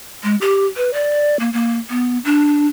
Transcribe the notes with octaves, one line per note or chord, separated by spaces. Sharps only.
G#3
G4
B4
D5
A#3
A#3
B3
D4